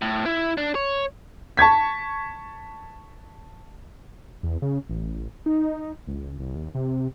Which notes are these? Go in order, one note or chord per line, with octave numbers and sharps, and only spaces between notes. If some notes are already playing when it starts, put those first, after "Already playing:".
A2
E4
D4
C#5
A5 C#6 G#6 B6
E2
C#3
A1
D#4
C#2
C2
D#2
C3